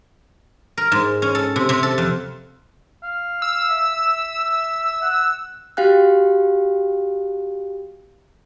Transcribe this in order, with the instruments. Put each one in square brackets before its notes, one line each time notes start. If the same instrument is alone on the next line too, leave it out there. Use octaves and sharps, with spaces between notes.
[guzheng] A#4
G#2
C#4
A4
C3
C3
A4
F2
[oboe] F5
[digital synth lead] E6
[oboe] E5
F#5
[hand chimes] F#4 G4 F5 G5 F#6